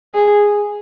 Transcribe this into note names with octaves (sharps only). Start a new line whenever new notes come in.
G#4